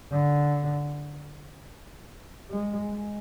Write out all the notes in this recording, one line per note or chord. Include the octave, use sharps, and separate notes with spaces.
D3
G#3
G#3